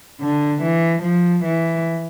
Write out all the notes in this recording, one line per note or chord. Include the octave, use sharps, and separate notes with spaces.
D3
E3
F3
E3